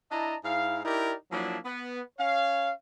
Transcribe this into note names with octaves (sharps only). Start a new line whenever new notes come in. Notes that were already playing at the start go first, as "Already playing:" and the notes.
D4 E4 D#5 A5 A#5
G#2 E4 F5
D#4 E4 G4 A#4 D5
F3 F#3 A#3 D4 E4
B3
C#4 C#5 F5